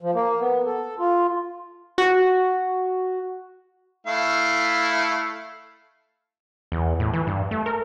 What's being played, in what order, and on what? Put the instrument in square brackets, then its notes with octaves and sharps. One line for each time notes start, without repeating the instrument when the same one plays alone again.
[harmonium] F3
A#3
B3
A4
F4
[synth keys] F#4
[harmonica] A3 E4 F5
[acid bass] E2
A2
E3
G2
A3
A#4